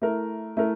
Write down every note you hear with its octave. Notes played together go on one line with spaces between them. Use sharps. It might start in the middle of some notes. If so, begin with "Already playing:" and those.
A3 E4 A#4
A3 E4 A#4